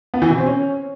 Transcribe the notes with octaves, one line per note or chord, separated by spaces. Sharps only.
B3
E3
B2
C4
C#4